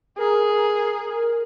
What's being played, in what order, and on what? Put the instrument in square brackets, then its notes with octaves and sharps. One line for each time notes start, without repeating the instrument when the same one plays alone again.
[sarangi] G#4 [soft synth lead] A#4